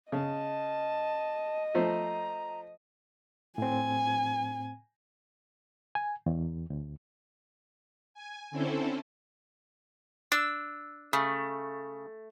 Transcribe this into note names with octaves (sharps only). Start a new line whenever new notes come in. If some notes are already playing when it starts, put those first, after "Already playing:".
C#3 D#5 A5
F3 A3 C5 A#5
A2 C4 G#5
G#5
E2
D2
G#5
D3 C4 C#4 E4 A4 C5
D4 E6
C#3 A3